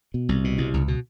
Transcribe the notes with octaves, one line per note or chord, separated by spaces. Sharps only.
B2
C2
B2
C2
C#2
B2